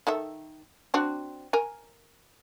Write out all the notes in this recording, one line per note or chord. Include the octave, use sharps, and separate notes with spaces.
D#3 A4 E5
C4 D4 F#4
A#4 G#5